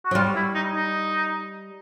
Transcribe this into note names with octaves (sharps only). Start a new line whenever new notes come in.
F#4
F#3
G3 F4
E4
D#4
D#4